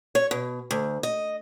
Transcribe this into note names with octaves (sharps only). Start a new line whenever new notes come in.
C#5
B2
D2
D#5